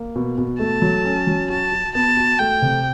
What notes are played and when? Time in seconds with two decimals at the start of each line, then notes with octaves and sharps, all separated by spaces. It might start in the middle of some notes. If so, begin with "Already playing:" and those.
Already playing: A#3
0.16 B2
0.38 B2
0.60 A3 A5
0.82 F#3
1.05 C#4
1.27 F#3
1.50 F#4 A5
1.72 F#4
1.95 B3 A5
2.17 F#4
2.39 A3 G5
2.62 C3